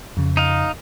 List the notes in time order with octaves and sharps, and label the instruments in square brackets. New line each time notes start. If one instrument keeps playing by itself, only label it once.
[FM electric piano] F2 C#3
[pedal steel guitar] D#4 F5